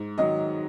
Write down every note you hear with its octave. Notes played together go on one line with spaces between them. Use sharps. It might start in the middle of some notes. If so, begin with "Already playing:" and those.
Already playing: G#2
D#3 F#3 D#5